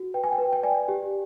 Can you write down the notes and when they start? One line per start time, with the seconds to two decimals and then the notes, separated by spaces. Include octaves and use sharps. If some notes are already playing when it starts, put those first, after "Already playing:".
Already playing: F#4
0.14 B4 G5
0.24 G#5
0.32 G5
0.38 B4
0.53 G5
0.63 D5 G#5
0.88 G4